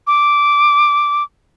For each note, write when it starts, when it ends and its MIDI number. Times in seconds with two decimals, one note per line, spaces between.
0.07 1.23 86